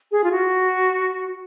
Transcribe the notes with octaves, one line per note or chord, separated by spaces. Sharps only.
G#4
F4
F#4